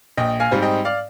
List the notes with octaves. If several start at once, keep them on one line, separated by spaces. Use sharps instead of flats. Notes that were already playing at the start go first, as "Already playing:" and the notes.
A#1 D#5 G5
F5 G#5
G#2 G3 C4
D#5 G5
D5 F5